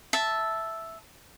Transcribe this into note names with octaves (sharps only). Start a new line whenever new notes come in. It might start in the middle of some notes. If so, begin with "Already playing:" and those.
E5 A5